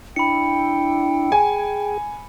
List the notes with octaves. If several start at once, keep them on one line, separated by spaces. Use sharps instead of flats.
D4 E4 G5 B5 C#7
G#4 G#5